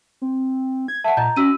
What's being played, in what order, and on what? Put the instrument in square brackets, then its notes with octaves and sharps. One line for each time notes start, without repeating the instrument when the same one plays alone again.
[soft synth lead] C4
G#6
[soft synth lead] E5 [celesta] F#5 A5
[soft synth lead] A#2 [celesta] D#5 A#5 G6
[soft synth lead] C#4 [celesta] F#4 E6 D#7